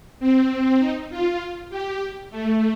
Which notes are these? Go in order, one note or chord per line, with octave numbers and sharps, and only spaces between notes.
C4
D#4
F4
G4
A3